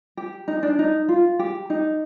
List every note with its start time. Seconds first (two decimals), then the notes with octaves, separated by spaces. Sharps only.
0.17 G4
0.48 D#4
0.63 D4
0.79 D#4
1.09 F4
1.39 G4
1.70 D#4